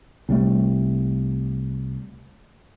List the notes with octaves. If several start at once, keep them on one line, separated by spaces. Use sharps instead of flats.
C2 G3 A3